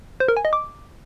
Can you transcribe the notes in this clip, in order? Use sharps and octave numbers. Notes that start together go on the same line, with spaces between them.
C5
A#4
G#5
D#5
D6